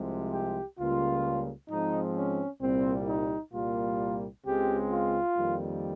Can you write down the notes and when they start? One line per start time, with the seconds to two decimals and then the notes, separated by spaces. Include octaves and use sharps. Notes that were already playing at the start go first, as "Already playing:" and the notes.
Already playing: C2 C3 F3 G#3
0.32 G4
0.78 C#2 C#3 G3 A#3 F4
1.69 G#2 F3 G#3 C4 D#4
2.16 C#4
2.61 C2 A#2 G3 C4
3.08 D#4
3.53 C2 A#2 G3 A#3 F4
4.45 C#2 C#3 G#3 C4 G4
4.91 F4
5.37 F2 D#3 G3 A#3